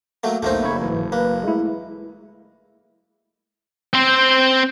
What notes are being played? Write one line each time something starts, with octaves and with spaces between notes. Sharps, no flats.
F#3 A3 A#3
B1 E2 A3 A#3 D#4 C5
F#1 B5 C#6 G#6
G#2 E3
A#3 B4
G#3 A3 E4
C4 C5